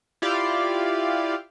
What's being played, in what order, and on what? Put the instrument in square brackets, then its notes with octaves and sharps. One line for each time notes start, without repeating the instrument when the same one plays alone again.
[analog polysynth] E4 F4 G4 D5 F5